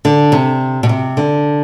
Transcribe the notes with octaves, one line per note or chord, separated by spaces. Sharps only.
D3
C3
B2
C3
D3